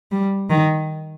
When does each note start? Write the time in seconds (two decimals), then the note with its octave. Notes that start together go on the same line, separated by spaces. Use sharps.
0.12 G3
0.50 D#3